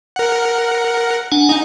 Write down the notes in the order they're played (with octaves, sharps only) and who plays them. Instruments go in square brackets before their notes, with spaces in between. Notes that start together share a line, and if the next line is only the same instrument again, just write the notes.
[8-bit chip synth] A#4 F#5
[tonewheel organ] D4 F#5 G#5
[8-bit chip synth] D#4